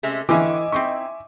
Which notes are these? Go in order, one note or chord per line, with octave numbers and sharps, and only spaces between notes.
C3 G#3 A3 C#4
D3 E3 C4 C#4 D#5 E5 G#5 D6
C4 D#4 E4 C#6